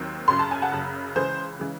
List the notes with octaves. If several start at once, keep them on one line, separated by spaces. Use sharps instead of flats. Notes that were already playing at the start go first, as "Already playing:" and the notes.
Already playing: D#2 D#3 F#3 C4
F#1 F#2 C#3 C6
A5
G#5
F#5 A5
F#1 F#2 C#3
C#2 C#3 E3 G#3 G#4 C5
C#3 E3 G#3